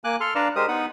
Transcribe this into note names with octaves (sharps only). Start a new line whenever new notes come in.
A#3 G#5 D6 F#6
A4 C6 F6
D4 B4 D5 F5 A5 A#5
G#3 G4 A#4 C5 D#6
B3 D#4 F#5 B5 D#6